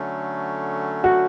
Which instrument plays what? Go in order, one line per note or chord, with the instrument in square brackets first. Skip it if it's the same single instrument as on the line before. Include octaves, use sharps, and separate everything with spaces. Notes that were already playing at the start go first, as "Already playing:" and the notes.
Already playing: [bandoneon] D3 F#3 A3 C#4
[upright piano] F#4